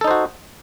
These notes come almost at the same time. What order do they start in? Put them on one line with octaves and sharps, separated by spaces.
A4 D#4 C5 F#4